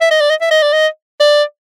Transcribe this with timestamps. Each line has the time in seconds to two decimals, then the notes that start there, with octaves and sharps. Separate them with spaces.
0.01 E5
0.11 D#5
0.21 D5
0.30 D#5
0.41 E5
0.51 D#5
0.62 D5
0.73 D#5
1.20 D5